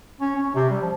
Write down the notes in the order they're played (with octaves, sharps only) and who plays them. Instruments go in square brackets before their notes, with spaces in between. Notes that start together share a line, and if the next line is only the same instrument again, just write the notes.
[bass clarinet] C#4
C#4
C3
G3
F3